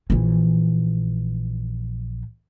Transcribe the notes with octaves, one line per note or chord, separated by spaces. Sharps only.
A#1 E3